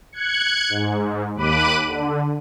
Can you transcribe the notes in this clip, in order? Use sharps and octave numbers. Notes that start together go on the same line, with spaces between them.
F#6 G#6 C#7
G#2
D#2 B5 D6 F#6 D#7
D3